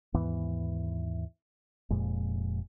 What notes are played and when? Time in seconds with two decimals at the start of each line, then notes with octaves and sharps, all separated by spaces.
0.14 D#2 G#2 E3 B3
1.90 F1 F2 A#2 G#3